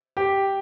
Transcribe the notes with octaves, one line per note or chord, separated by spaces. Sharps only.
G4